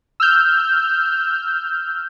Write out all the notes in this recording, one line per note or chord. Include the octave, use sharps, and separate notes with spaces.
E6 F6 G6